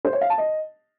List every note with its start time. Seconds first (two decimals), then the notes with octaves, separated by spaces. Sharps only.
0.05 C5
0.13 C#5
0.21 F5
0.30 A5
0.38 D#5